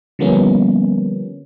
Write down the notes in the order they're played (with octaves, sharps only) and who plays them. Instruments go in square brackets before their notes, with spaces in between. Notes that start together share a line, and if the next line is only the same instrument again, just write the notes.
[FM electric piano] D3 F3 G3 A#3 B3 C#4